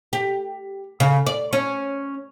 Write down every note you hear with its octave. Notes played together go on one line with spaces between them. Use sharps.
G4
C#3
D5
C#4